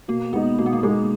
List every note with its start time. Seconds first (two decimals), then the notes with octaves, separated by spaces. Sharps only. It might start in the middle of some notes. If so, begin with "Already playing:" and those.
0.08 B2 A#3
0.33 G#3 B3 D#4
0.58 B2 A#3
0.66 B3
0.73 A#3
0.83 G#3 A#3 D#4